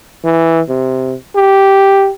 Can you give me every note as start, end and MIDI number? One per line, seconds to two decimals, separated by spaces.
0.24 0.61 52
0.69 1.15 48
1.35 2.11 67